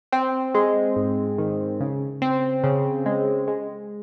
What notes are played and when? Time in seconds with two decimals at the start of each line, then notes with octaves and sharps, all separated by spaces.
0.12 C4
0.54 G#3
0.96 G#2
1.38 D#3
1.80 C#3
2.22 C4
2.64 C#3
3.06 G#3
3.48 G#3